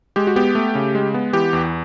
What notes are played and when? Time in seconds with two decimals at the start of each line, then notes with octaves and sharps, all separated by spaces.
0.16 G#3 G4
0.27 F#4
0.36 B3 G4
0.55 A3
0.75 C#3
0.95 G#3
1.14 B3
1.33 E3 G4
1.53 E2